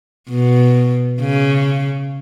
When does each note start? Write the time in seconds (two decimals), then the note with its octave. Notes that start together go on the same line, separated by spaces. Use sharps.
0.29 B2
1.21 C#3